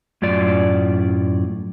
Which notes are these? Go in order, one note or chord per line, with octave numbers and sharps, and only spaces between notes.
F#2 A2 F4 D5